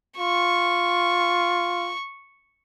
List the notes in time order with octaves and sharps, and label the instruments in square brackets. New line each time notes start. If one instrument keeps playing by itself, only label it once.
[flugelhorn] F4 [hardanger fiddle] C#6